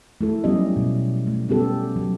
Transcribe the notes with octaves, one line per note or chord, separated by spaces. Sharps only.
A3 E4 A4
F#3 G3 B3 C#4 G4 D#5
B2
A3
G3 B3 C#4 G4 A4
F#3